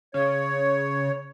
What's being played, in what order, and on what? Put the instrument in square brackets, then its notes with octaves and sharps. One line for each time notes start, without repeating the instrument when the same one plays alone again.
[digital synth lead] C#3 [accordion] C#5